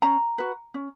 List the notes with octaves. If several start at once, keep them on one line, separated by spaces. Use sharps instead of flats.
C#4 A#5
F#4 B4
C#4